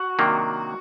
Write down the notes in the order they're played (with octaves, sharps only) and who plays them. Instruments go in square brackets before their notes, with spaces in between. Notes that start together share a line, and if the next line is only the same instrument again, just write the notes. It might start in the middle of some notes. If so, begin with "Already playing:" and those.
Already playing: [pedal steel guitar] F#4
[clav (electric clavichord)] C3 D#3 F#3 A#3 D4